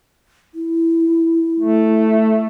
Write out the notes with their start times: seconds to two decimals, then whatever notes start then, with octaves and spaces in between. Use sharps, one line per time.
0.54 E4
1.60 A3